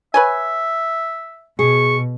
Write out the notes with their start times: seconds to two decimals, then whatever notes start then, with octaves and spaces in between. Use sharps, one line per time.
0.14 B4 C#5 E5 G#5
1.59 B2 G#4 C#6